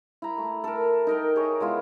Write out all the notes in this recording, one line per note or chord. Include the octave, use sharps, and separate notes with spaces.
E4 A#5
A3
A4 A#4
D#4 A#4 G5
G#4 C#5 E5
G#3 B3 E4 F4